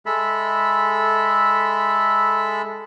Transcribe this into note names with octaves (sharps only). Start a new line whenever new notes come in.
G#3 A4 E5 B5